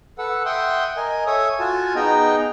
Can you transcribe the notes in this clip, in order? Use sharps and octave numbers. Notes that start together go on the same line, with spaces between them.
A4 B4 F#5 E6
E5 F#5 G5 C6 D#6
A#4 D#5 G#5
A4 C#5 E5 G#5 D#6
F4 F#4 G#5 A5
B3 D#4 G#4 D#5 G5 A#5